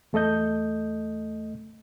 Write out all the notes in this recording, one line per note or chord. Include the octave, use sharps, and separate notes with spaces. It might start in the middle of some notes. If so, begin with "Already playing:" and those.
E2 A3 A4 D#5 G6